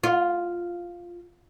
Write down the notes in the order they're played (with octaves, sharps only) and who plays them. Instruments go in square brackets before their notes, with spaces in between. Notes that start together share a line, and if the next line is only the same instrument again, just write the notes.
[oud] F4